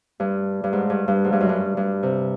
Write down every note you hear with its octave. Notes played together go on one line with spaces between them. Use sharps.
G2
G2
G#2
G2
G2
G#2
G2
F#2
G2
G2
C3